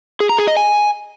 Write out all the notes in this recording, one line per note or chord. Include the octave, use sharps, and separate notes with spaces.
G#4
A#5
G#4
D#5
G#5